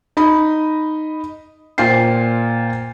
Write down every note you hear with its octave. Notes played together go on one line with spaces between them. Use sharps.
D#4 D#5 B5
A#2 F4 C5 G5 C7